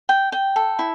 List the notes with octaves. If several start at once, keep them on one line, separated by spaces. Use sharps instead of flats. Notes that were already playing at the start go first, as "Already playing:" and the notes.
G5
G5
A4
E4